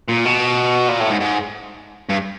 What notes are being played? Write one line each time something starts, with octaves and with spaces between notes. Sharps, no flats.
A#2
B2
A#2
A2
G#2
G#2
G2